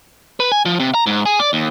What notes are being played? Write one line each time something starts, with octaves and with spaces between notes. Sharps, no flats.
B4
G#5
F3
C3
A#5
G#2
G#4
D5
D#2